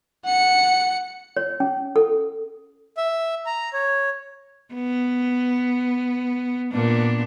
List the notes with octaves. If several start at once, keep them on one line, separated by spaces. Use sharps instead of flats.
F#5 C#7
C#5
C#4
A4
E5
A#5
C#5
B3
A#2 B3 D4